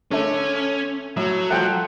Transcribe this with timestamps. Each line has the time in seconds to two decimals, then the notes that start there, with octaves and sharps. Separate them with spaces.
0.11 D3 A3 C#4
1.17 A2 F#3
1.50 F3 A3 F#5 G5